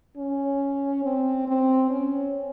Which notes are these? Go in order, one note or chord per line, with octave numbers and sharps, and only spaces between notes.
C#4
C4
C4
C#4